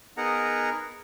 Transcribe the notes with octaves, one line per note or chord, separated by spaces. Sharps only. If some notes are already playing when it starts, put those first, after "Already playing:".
B3 D#4 G#4 A#4 F#5 A#5